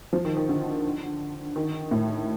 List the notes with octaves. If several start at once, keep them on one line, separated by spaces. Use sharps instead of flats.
F3
D#3
D#3
D3
D#3
A2